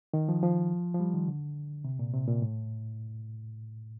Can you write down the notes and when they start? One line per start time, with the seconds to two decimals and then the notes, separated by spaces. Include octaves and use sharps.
0.14 D#3
0.29 F3
0.43 F3
0.94 F3
1.00 G3
1.14 D#3
1.28 D3
1.84 C3
1.99 A#2
2.13 C3
2.27 A#2
2.42 A2